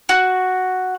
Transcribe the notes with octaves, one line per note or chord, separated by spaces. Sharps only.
F#4